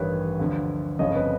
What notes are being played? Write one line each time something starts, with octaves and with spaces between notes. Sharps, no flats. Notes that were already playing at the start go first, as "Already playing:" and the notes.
Already playing: A1 G2 D#3 B4 C#5
D2 D3 F3
G1 F2 C#3 F3 C#5 D#5
B4 C#5